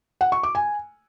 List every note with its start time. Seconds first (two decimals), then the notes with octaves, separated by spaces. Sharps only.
0.21 F#5
0.32 C#6
0.43 D6
0.55 G#5